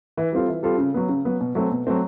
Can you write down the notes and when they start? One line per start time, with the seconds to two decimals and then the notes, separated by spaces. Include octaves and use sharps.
0.17 E3
0.33 G3 C4 F4 A4
0.48 E3
0.63 G3 C4 F4 A4
0.78 C#3
0.94 F#3 B3
1.09 C#3
1.25 F#3 B3
1.41 B2
1.55 F#3 A3 C4
1.71 B2
1.87 F#3 A3 C4